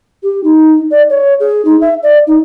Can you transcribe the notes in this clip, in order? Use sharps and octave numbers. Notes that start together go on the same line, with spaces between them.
G4
D#4
D5
C#5
G#4
D#4
E5
D5
D#4